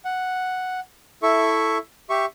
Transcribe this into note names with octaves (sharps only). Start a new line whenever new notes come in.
F#5
E4 A4 E5 C#6
G4 E5 C#6